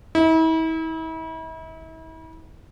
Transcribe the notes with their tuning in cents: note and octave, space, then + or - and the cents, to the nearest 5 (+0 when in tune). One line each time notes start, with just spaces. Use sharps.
E4 -40